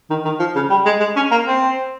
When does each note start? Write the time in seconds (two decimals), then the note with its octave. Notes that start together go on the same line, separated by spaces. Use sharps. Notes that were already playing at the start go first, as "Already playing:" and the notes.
0.10 D#3
0.25 D#3
0.39 F3
0.55 C#3
0.70 G3
0.86 G#3
1.00 G#3
1.16 C#4
1.31 A#3
1.47 C4